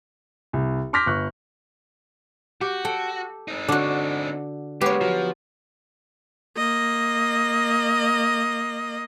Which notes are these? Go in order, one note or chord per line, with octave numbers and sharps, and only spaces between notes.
C2
C6 D6 F6 G6 A#6 B6
G1 C#6 F#6
F#4 G4
A4 G5
C4 D#4
D3 D4 F#4
G#3 A#3 B3 G4 C#5
F3 F#3
A#3 D#5